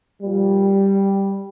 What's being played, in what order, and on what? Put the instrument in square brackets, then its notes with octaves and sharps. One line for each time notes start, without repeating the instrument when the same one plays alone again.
[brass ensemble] A#2 F3 G3